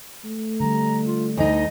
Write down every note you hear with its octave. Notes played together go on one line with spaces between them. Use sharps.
A3
D3 G3 A#5
F4
D2 D#4 D#5